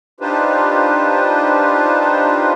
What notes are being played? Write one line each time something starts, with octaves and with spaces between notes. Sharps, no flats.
D4 D#4 F4 G4 B4 C5